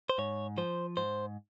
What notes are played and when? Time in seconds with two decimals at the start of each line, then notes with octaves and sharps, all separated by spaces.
0.10 C5
0.18 G#2 C#5
0.58 F3 C5
0.97 G#2 C5